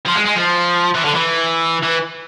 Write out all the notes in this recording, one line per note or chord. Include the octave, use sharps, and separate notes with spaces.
F3
G#3
G#3
F3
E3
D3
E3
E3